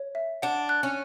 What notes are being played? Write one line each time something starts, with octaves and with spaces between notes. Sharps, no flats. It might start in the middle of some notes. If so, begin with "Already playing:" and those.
Already playing: C#5
E5
D4 F#5
F#6
C#4